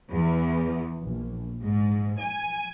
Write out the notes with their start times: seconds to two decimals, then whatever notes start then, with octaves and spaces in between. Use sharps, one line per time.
0.11 E2
0.99 A#1
1.62 G#2
2.17 G#5